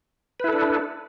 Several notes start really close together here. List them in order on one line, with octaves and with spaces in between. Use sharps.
B4 E4 A4 D4